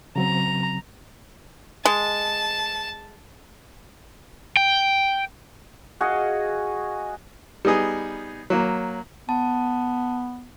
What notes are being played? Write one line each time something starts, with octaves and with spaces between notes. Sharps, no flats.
C#3 F#3 C4 A#5
G#3 A5
G5
F#4 G#4 D#5 F5
G3 B3 D#4 G#4
F#3 A#3
B3 A5